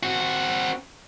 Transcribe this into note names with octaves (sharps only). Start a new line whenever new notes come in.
C4 F#4